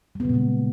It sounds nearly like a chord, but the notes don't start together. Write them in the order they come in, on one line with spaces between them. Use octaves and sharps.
G3 B3 C#3 A#2 G#3